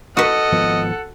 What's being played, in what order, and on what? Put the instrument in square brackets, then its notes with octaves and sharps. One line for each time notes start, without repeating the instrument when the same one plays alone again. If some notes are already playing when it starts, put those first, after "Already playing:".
[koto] F#4 B4 [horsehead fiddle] A4 F#5 [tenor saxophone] D#5
[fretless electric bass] G#1 F3 B3